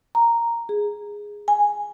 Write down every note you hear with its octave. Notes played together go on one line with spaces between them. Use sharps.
A#5
G#4
G#5